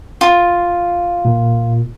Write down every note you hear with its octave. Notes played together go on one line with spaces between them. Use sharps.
F4
A#2